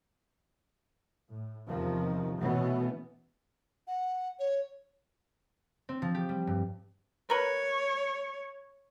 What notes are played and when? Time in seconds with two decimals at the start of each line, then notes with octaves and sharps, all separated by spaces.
1.29 A2
1.68 E2 C3 D#3 F3
2.39 B2 E3 A3 B3 C#4
3.87 F#5
4.39 C#5
5.89 C4
6.02 F3
6.15 G4
6.29 G3
6.47 G2
7.30 A#4 B4 C#5